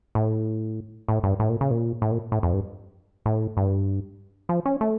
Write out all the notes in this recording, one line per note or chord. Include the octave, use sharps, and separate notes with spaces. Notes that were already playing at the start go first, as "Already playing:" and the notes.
A2
A2
G2
A2
A#2
C#3
A#2
A2
A#2
A2
F2
G2
A2
G2
F3
C#4
A3